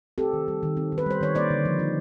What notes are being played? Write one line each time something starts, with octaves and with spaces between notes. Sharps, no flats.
C4 G4 A4
D#3
G3
D#3
C4
D#3
B4
G3 C5
D#3 C#5
A#3 C5 D5
D3
F3
D#4